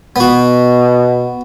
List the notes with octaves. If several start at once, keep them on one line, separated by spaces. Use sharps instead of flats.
B2 B3 F#4